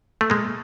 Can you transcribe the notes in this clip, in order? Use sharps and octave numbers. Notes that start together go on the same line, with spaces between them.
A3
G#3 A#3